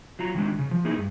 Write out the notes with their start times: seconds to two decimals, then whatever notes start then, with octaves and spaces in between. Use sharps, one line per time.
0.19 F#3 F4 A#5
0.34 D#3 G#3 D4
0.58 C#3
0.71 F3
0.85 A#3 D#4 E4 G#4
0.97 G2